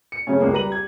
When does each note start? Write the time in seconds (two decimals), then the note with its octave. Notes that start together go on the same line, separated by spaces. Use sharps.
0.12 C#7
0.27 C#3 F#3 A3 C#4
0.40 C#2 G#3 A#3
0.53 G3 B4 A#5 D#7 F#7
0.70 G4 G#6